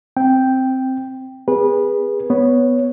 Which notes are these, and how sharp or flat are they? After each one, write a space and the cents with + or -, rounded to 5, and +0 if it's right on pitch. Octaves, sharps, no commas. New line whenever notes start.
C4 +0 G5 +0
C4 -45 G#4 -30 B4 -25
B3 +0 C#5 +0